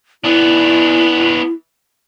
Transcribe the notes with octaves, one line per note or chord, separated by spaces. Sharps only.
B3 D4 E4